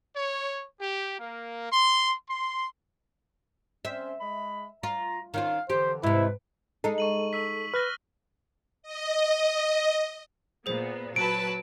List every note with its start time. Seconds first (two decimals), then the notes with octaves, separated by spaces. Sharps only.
0.16 C#5
0.81 G4
1.19 A#3
1.72 C6
2.29 C6
3.85 C4 C#4 C5 E5
4.21 G#3 B5
4.83 F4 A#5
5.34 D#3 C#4 F4 F5
5.70 F2 D3 E3 G4 C5
6.03 G#2 C3 E4 B4
6.84 G#3 D#4 A4
6.98 C#6 D#7 F#7
7.33 C#6 E6 B6
7.74 B4 F6 F#6 A#6
8.83 D#5
10.66 A#2 B3 G#4 C5
11.16 F#3 B4 A5 D7